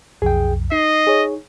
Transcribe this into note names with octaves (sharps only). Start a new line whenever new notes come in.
B1 F2 G#4 G5
D#4 D#5 C7
G#4 C#5